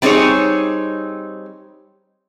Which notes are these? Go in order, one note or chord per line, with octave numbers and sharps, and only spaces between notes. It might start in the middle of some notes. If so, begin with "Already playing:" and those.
G3 C4 D#4 G#4 C#5